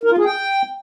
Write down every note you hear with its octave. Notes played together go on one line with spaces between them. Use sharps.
A#4
F4
G#4
G5